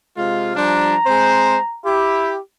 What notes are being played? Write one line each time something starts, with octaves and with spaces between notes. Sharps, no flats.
C3 G#3 F4
F3 G3 D4 A#5
G#3 C4 C5
E4 G4